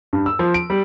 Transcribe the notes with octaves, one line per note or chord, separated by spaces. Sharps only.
G2
E6
F3
D7
G3